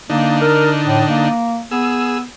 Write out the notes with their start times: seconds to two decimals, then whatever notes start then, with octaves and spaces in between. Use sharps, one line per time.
0.10 D3 A#3 D4 D#4
0.41 A#4
0.85 A2
1.08 A#3
1.71 B3 G#4 E6